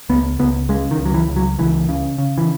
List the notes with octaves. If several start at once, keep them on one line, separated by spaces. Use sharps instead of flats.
C#2 B3
C#2 B3
C#3 G#3
D#3
C#2
F#3
E3
C#2
F#3
C#2 E3
C#3
C#3
E3